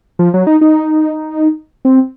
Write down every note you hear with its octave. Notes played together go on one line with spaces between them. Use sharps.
F3
F#3
D#4
D#4
C4